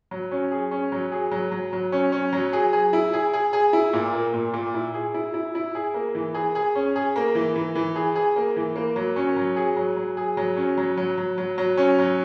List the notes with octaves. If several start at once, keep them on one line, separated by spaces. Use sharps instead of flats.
F#3
C#4
G#4
C#4
F#3
G#4
F#3
F#3
F#3
C#4
C#4
F#3
G#4
G#4
E4
G#4
G#4
G#4
E4
A#2
A#3
A#2
A#2
E4
G#4
E4
E4
E4
G#4
A#3
E3
G#4
G#4
C#4
G#4
A#3
E3
E3
E3
G#4
G#4
A#3
E3
A#3
F#3
C#4
F#3
G#4
F#3
F#3
G#4
F#3
C#4
F#3
F#3
F#3
F#3
F#3
C#4
F#3